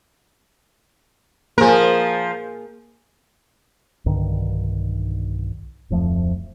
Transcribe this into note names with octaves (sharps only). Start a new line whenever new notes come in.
F3 A#3 G#4 A#4
B1 G2 D3 D#3
D1 F2 F3 A3